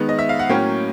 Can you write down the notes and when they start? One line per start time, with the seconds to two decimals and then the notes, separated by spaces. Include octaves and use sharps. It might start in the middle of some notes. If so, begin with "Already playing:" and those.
Already playing: D#3 G#3 B3
0.09 D#5
0.19 E5
0.29 F5
0.39 F#5
0.49 A2 F#3 A#3 C#4 G5